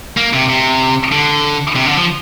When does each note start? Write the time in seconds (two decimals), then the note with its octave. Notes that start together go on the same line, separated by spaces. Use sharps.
0.17 A#3
0.33 C3
0.49 C3
1.12 D3
1.76 C3
1.86 D3
1.97 F3